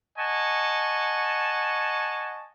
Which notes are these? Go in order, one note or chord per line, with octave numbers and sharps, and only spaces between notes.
D#5 F#5 G#5 A5 C#6